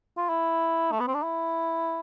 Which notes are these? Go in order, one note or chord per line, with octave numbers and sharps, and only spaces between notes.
F4
E4
A3
B3
C4
D4
E4